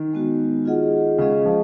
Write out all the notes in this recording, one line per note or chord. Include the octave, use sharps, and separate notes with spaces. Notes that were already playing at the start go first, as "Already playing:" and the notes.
Already playing: D#3
G#3 B3 F#4
F4 G#4 D#5 F#5
C#3 G#3 C#4 G#4 D#5
F3